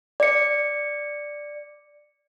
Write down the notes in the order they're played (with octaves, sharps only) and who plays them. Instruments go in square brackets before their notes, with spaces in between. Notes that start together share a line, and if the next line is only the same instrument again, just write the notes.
[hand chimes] D5 C#7